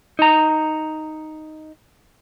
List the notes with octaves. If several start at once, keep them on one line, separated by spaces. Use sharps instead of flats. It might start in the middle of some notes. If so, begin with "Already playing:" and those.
D#4 A#5